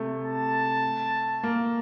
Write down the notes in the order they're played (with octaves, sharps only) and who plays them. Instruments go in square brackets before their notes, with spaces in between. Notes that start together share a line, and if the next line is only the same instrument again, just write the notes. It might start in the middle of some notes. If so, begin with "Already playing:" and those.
Already playing: [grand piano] C3 A3
[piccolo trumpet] A5
[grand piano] A#3